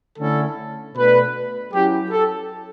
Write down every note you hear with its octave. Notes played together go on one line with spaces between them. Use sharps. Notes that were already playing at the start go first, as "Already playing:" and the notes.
D3 A3 C#4 E4 A4
B2 A3 D4 B4
F#3 C#4 E4 G4
A4